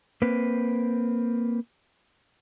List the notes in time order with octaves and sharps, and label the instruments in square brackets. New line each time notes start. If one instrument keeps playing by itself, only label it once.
[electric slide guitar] A#3 C4 B4